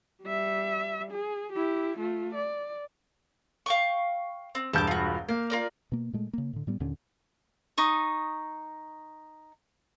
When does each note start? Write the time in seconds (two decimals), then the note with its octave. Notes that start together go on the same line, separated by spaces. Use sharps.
0.23 G3 E5
1.12 G#4
1.53 E4 G4
1.98 A3 F4
2.35 D5
3.66 F5 G5 C#6
4.55 C4
4.73 E1 G2 A5 C#6 D6 G6
4.87 F4 F#4
5.29 A#3 F5
5.50 F4 A#4 D5
5.92 B2 A#3
6.13 A#2 G#3 A3
6.33 C#3 A#3
6.53 A2 D3
6.67 A2 G3 B3
6.80 D#2 A#2 D3 C#4
7.77 D#4 C#6 D#6